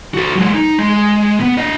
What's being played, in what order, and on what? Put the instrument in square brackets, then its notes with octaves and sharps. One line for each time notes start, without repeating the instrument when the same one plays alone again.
[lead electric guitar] F#4 A4
F#3 G#3
D#4
G#3
B3
D4 D#5